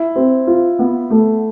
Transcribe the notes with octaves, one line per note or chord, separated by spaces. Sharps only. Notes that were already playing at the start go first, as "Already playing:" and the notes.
Already playing: E4
C4
F4
B3
A3